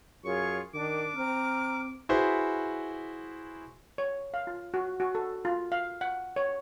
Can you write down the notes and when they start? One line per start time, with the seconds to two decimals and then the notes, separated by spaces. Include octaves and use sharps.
0.25 F#2 F4 G#4 C#5 C#6
0.74 D#3 D4 D6
1.15 C4 A#5 F6
2.09 E4 F#4 G#4 B4 C5
3.98 C#5
4.34 F5
4.47 F4
4.74 F#4
5.00 F#4
5.15 A4
5.45 F4
5.72 F5
6.01 F#5
6.36 C#5